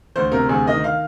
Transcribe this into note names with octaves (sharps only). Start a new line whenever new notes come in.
D2 C5
C3 A#4
D2 G#4
D#3 D#5
F5